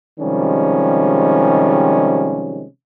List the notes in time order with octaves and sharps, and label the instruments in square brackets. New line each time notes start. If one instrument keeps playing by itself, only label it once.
[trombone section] C3 D#3 F3 G3 G#3 C#4